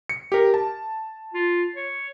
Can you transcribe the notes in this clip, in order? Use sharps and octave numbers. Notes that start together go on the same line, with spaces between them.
C#7
G4 A#4
A5
F4
C#5